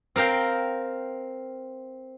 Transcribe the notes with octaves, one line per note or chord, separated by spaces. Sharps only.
C4 A#4 F5 G5